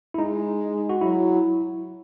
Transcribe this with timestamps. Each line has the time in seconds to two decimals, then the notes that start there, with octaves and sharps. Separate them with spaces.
0.14 E4
0.18 G#3 D#4
0.89 F#4
1.01 F#3 E4